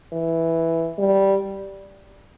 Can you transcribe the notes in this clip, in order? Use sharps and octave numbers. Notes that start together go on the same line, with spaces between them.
E3
G3